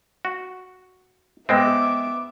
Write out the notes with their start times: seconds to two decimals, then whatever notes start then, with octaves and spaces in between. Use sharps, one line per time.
0.25 F#4
1.49 G#3 B3 C4 E5 G5 D6 E6